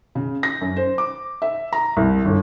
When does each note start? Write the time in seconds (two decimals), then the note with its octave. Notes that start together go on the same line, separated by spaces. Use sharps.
0.15 C#3
0.43 A#6
0.61 F#2
0.76 C5
0.98 D6
1.42 E5
1.73 A#5
1.97 C2
2.25 G1